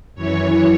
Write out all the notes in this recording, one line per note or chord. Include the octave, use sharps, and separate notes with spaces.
F#2 E3 C#5